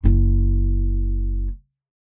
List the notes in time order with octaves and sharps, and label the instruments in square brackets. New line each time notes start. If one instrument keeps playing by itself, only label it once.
[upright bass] F#1 E4